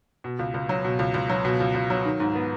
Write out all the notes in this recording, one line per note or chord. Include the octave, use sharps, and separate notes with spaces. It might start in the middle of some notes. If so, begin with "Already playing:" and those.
B2
C#2
C#2
F#3
B2
C#2
C#2
F#3
B2
C#2
C#2
F#3
D#3
G#2
B3